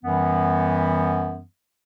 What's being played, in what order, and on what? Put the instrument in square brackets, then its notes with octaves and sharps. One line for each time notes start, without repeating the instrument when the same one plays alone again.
[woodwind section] F#2 E3 G3 B3